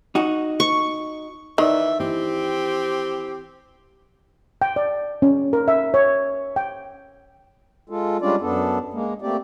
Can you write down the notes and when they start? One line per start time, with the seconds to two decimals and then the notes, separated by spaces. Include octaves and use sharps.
0.15 D#4 F#4
0.60 C#6
1.58 D#3 E3 D#4 D5 E5
2.00 E3 C4 G4
4.62 G5
4.76 D5
5.22 C#4
5.53 A#4
5.68 E5
5.94 C#5
6.56 G5
7.90 G#3 F4 A4
8.22 G3 G#3 C#4 D4 F4 D5
8.41 F#2 B3 D4 A4
8.94 G#3 A#3
9.22 A3 A#3 C4 G4 D5